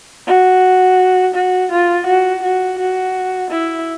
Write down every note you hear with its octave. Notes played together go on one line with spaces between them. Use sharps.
F#4
F#4
F4
F#4
F#4
F#4
E4